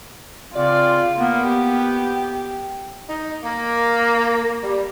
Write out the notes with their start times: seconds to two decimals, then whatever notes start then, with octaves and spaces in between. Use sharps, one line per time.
0.56 C#3 C4 F4 D5
1.20 A#3 B3
1.48 G4
3.08 D#4
3.43 A#3
4.63 G3